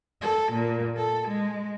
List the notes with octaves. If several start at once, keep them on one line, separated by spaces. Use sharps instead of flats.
A4
A#2
A4
G#3